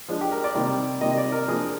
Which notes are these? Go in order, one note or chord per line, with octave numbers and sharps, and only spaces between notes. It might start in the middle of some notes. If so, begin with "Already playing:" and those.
F3 G#3 D4
G4
A#4
D5
C3 D#3 G3 A#3
C3 D#3 G3 A#3 D#5
D#5
D5
A#4
F3 A#3 D4 G#4